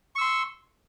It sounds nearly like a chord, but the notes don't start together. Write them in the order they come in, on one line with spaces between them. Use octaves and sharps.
C#6 E6 C6